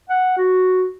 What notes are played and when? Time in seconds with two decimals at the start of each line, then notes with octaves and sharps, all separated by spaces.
0.10 F#5
0.37 F#4